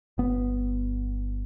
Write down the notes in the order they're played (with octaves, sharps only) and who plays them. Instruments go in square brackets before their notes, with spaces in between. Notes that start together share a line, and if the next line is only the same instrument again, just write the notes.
[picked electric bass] G1 B3